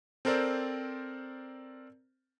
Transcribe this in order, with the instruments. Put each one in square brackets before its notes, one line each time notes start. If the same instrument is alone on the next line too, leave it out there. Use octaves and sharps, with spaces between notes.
[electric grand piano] C4 A4 A#4 C5 D5